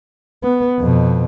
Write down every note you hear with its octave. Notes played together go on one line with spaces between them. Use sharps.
B3
F2 B2